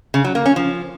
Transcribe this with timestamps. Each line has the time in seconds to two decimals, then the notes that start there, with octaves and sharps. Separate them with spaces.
0.14 C#3
0.25 F#3
0.35 A#3
0.46 C#4
0.56 F3